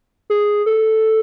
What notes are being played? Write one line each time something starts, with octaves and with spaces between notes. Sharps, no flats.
G#4
A4